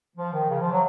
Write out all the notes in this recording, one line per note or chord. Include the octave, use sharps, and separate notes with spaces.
F3
D#3
C#3
F3
F#3